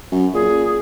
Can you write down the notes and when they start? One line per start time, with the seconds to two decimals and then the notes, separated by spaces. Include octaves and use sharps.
0.12 F#2
0.34 A#2 G#4